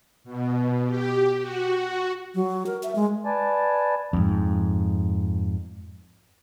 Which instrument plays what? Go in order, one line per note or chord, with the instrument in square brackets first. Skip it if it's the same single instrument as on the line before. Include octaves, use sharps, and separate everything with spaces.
[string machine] B2
G4
F#4
[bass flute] F#3
A#4
E5
G#3
[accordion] B4 D5 G#5 A5
[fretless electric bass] F2 G#2